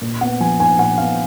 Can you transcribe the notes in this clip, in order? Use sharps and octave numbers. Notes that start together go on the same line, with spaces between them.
A#2
B3 F#5
F3 G#5
D#4 G#5
A#2 F#5
B3 F5